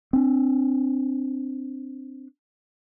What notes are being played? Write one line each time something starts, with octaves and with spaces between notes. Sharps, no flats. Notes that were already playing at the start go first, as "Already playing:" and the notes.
C4 D4